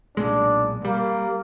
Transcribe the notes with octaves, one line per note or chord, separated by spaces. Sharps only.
B1 A#2 G#3 D4
G3 A#3